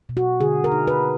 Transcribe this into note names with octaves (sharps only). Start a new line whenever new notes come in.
B2
F#4
D3 G#4
A#4
D#4
B4